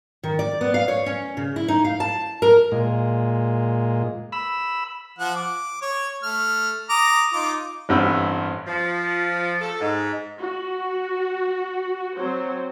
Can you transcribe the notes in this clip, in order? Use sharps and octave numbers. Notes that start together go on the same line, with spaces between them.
D#3
D5
B3
F5
C#5
C#4
C#3
E4
D#4
F5
A5
A#4
A#2 G#3
B5 E6
F3 F#5
D6
C#5
A3 F6
A#5 D6 D#6
D#4 F4 D6
A1 G2 B3 C4 E6
F3
A4
G#2
F#4
F#3 C4 C5